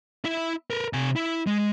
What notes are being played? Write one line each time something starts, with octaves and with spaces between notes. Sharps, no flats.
E4 E5
A#4 B4
C3 G#5
E4
G#3